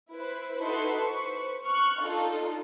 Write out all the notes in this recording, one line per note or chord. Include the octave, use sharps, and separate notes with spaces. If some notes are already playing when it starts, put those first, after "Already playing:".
E4 B4 C5
D#4 E4 F#4 A4 B4 C6
B4 C5 C#6
C#6 F6 F#6
D4 D#4 F4 A4